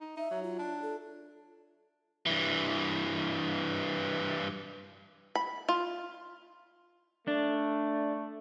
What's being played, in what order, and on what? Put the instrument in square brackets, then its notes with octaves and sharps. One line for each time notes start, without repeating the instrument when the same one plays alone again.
[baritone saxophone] D#4
[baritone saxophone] D#4 [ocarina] E5
[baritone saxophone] F#3
[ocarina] F4
[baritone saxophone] D4
[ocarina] A4
[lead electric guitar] G2 E3
[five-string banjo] B5
F4
[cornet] A3 [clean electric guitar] D4